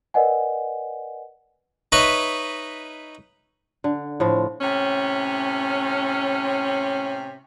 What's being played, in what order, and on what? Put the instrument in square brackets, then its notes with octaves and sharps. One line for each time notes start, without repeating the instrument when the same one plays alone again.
[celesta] A#4 B4 D5 D#5 F#5 G#5
[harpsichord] D#4 B4 C#5 D#5 E5
[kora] D3
A2 F3 F4
[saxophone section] A2 C3 C#4